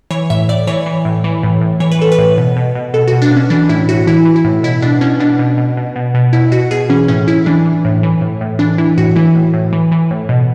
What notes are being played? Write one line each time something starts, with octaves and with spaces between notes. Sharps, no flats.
E3 C#5
A2 E5
A2 D5
E3 C#5
E3
A2
E3
A2
A2
E3 C#5
B4
E3 A4
B4
A2
B2
B2
B2
B2 A4
B2 F#4
D4
B2 C#4
E3 D4
A2 E4
A2 F#4
E3 E4
E3
E4
A2
B2 E4
B2 D4
B2 C#4
B2 D4
B2
B2
B2
B2
B2
B2 E4
B2 F#4
B2 G#4
E3 C#4
A2 C#4
A2 E4
E3 D4
E3
A2
E3
A2
A2
E3 D4
E3 E4
A2 F#4
E3 E4
A2
A2
E3
E3
A2
B2